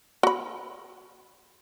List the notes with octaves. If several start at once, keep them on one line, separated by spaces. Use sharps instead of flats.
F#4 B5